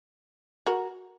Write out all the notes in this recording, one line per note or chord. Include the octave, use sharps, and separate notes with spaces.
F#4 A#4